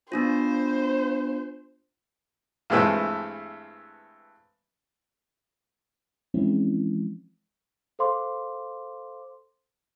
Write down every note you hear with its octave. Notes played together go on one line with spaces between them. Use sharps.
B3 D4 F4 C5
G2 E3 G#3 A3 C4
E3 F3 G#3 C4 C#4 E4
A4 C5 F5 C6 D6